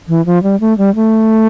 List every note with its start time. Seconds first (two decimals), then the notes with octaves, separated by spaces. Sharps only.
0.08 E3
0.26 F3
0.43 G3
0.60 A3
0.78 G3
0.95 A3